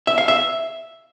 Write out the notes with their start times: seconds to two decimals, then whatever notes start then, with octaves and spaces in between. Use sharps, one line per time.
0.07 E5
0.18 F5
0.28 E5